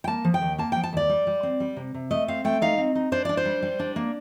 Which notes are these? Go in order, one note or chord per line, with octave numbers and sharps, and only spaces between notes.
G5
A#3 A5
F3
G5
D#2
A#3 A5
G5
F3
A5
D#2 D5
G3
G3
C4
G3
C3
C3
A3 D#5
C4 F5
A3 G5
D#4 F5
C4
D#4
D4 C5
D4 D5
C5
G3
G3
D4
A#3